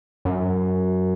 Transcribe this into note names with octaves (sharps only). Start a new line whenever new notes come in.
F#2